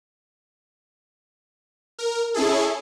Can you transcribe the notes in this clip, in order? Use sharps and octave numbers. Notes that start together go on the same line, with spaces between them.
A#4
C#4 E4 G#4 A4